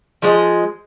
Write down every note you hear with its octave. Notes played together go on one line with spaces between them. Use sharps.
F3 G#3 D#5